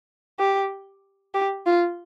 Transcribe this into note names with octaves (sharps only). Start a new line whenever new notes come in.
G4
G4
F4